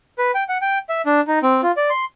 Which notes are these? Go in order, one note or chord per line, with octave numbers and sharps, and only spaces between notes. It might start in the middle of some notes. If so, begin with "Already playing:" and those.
B4
G5
F#5
G5
E5
D4
D#4
C4
F4
D5
C6